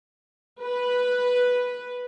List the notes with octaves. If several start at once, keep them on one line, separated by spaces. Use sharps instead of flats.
B4